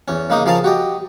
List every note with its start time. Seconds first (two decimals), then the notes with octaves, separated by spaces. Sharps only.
0.08 E2 C#4
0.30 C#3 G#3 A#3 D#4 D#6
0.46 C#3 F3 G#4 A#4 F5 A5
0.64 F#4 G4 D#5